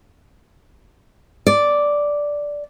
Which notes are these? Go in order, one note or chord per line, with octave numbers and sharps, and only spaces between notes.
D5